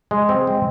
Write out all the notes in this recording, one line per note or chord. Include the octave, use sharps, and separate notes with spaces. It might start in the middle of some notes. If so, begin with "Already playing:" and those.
G#3
C4
G#3